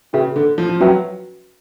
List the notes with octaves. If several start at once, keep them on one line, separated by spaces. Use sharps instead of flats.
C#3 C#4 F#4 B4 E5 G5
D3
F3
F3
F#3 C#4 F#4 B4 E5 G5